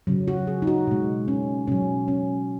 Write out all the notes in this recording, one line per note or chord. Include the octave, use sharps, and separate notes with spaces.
C#3 F#3
F#4
G#4
D#4
F#4
B2 G#3
C#4
B2 F#3 C#4
C#4